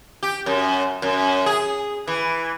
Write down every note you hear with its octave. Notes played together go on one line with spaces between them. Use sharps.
G4
F#2
F#2
G#4
E3